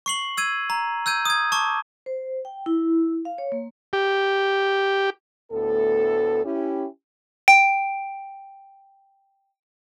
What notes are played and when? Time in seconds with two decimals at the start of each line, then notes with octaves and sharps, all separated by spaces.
0.06 C#6 C7 F#7
0.37 E6 G#6 D#7
0.70 A#5
1.06 E6 G6 G#6 D#7
1.25 D#6 G#6
1.52 A5 C#6 D6
2.06 C5
2.45 G5
2.66 E4
3.25 F5
3.38 C#5
3.52 A#3
3.93 G4
5.52 D2 A2 B3 A4
6.44 C#4 E4 G4
7.48 G5 D7